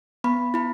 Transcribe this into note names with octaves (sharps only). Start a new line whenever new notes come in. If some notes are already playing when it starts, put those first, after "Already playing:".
B3 B5
E4 B5